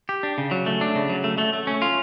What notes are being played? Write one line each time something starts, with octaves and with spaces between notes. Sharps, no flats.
G4
D4
C#3
F#3
A3
D4
C#3
F#3
A3
A3
A3
C#4
F4